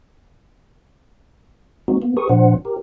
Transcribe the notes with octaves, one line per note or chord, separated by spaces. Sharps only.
G#3 A#3 C4 D#4 F#4
A#3 B3
G4 G#4 A#4 B4 C#6 D#6
A#2 F3 D4 C5 F#5
G4 A#4